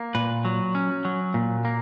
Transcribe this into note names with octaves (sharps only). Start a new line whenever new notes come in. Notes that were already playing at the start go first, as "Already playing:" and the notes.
Already playing: A#3
A#2 B4
F#3
C#4
F#3
A#2
A#3